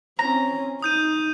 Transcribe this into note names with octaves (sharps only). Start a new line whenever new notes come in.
C4 C#4 A#5
D#4 D#6 G6 D#7